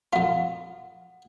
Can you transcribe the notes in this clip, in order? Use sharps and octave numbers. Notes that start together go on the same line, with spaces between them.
F2 F4 F#5